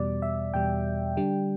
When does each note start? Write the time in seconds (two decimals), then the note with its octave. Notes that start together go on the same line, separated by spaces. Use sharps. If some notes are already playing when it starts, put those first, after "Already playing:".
Already playing: E2 B2 G3 D5
0.22 E5
0.54 E2 B2 G3 G5
1.17 D3 G3 D4